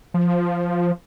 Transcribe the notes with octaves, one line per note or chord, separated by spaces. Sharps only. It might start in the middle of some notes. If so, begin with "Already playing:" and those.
F3